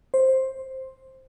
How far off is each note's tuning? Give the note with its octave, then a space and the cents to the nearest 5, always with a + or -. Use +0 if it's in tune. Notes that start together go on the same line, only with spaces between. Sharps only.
C5 +10